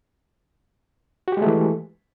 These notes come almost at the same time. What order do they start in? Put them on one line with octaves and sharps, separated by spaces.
F#4 G4 G#3 A3 E3